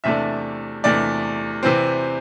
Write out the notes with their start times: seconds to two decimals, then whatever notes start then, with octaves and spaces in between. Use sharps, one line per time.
0.04 E2 C3 A3 D4 E5
0.84 E2 C3 A3 D4 D5
1.63 C3 E3 C4